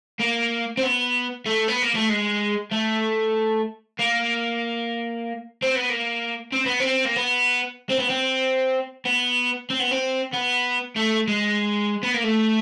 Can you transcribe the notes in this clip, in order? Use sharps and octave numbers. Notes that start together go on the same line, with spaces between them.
A#3
C4
B3
A3
B3
A#3
A3
G#3
A3
A#3
C4
B3
A#3
C4
B3
C4
A#3
B3
C4
B3
C4
B3
C4
B3
C4
B3
A3
G#3
B3
A#3
A3